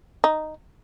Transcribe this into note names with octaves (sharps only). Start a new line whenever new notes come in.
D#4